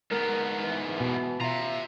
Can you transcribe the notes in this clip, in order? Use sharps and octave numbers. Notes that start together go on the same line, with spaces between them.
G#2 B3 A#4
E3
B2
F4 E5 A#5